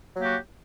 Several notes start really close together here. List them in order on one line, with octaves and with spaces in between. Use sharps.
F#3 A#3 G4 F#4